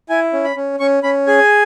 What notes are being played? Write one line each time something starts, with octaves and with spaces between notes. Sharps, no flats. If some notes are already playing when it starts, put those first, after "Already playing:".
E4 G#5
C#4
B5
C#4
C#4 C#6
C#4 B5
G#4 G#5